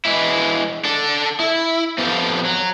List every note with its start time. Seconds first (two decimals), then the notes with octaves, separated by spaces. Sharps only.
0.05 E3 G#3 E4
0.85 D4 A4
1.40 E4
1.98 F3 B3 C4 F4 G4 A4
2.45 F#3